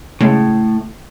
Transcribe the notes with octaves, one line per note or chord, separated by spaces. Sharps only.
A2 C#3 G#3